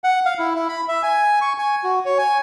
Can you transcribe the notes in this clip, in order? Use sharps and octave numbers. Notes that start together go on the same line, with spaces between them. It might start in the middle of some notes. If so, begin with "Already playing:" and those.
F#5
F5
E4
E4
B5
E5
G#5
C#6
G#5
F#4
C#5
G#5